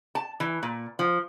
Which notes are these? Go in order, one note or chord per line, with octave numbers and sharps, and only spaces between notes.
A5
E3
A#2
F3